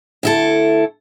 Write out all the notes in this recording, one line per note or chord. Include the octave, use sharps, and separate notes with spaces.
D2 E4 A4